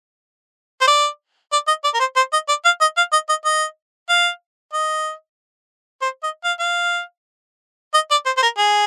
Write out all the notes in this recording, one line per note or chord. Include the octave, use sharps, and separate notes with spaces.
C5
D5
D5
D#5
D5
A#4
C5
C5
D#5
D5
F5
D#5
F5
D#5
D#5
D#5
F5
D#5
C5
D#5
F5
F5
D#5
D5
C5
C5
A#4
G#4